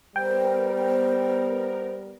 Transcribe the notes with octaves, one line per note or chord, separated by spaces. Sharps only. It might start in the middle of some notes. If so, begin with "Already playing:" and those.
G3 B3 A#4 C5 G5